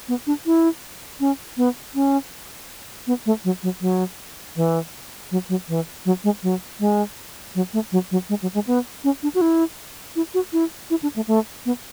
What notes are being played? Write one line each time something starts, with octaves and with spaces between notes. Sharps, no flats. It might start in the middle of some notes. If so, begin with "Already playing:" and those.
B3
D4
E4
C#4
B3
C#4
B3
A3
F#3
F#3
F#3
E3
F#3
F#3
E3
F#3
G#3
F#3
G#3
F#3
A3
F#3
F#3
G#3
F#3
G#3
B3
C#4
D4
F#4
E4
E4
F#4
E4
E4
D4
A3
A3
B3